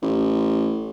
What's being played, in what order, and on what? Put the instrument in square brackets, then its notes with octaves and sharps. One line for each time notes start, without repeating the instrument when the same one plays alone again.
[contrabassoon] A1